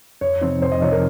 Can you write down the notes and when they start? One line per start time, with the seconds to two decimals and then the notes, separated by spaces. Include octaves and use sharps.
0.21 F2 C#5
0.41 C3 F3 C4 D#4
0.62 F2 C5
0.72 D#5
0.82 C3 F3 C4 D#4 C#5
0.92 A#4